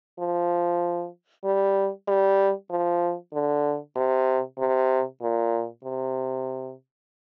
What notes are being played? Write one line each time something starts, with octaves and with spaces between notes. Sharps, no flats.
F3
G3
G3
F3
D3
C3
C3
A#2
C3